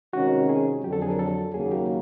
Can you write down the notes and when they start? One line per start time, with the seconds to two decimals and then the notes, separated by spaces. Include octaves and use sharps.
0.13 C3 D#3 G#3 C#4 F#4
0.49 G#4
0.84 F2 D3 F#3 G4
0.93 A4
1.02 G#4
1.10 A#4
1.19 A4
1.54 D#2 C#3 F#3 A#3 G#4
1.72 G4